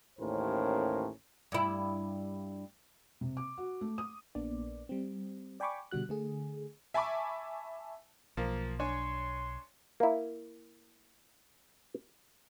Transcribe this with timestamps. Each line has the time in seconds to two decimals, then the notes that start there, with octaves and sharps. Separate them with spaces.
0.19 A1 D#2 A2 C#4 A#4 C5
1.52 G2 E4
3.21 C3
3.37 D6
3.58 F#4
3.81 A3
3.98 D#6
4.35 A#1 A#3 B3 D4 D5
4.89 G3 C4
5.60 D5 G5 G#5 B5 C#6 D6
5.91 B2 D3 G3 F#4 F#6
6.09 D3 A3 G#4
6.94 E5 G#5 A5 B5 C#6 D6
8.37 B1 F3 A#3
8.79 D4 C#5 G#5 C6
10.00 A#3 E4